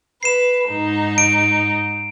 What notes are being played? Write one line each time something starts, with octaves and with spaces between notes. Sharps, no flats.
B4 C7 E7
G#2 D#4
D7